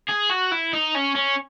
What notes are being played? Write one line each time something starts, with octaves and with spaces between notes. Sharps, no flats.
G#4
F#4
E4
D#4
C#4
C#4